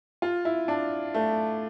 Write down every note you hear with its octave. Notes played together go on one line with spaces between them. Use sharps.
F4
E4
D4
A3